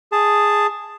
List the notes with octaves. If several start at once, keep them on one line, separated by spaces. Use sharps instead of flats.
G#4 A5